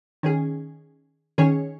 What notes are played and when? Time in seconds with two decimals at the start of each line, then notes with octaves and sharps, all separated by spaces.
0.23 D#3 C#4 G#4
1.38 D#3 C#4 G#4 C#5